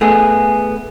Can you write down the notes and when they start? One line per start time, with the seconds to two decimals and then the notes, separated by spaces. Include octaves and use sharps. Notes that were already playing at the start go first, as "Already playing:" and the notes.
0.01 A3 B3 G#4